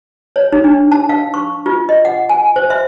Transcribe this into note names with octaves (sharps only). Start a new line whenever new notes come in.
C#5
D#4
D4
A5
F5
C#6
F4
D#5
F#5
G#5
C5
E5